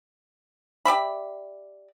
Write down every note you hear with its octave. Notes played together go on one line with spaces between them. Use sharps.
G4 D5 E5 B5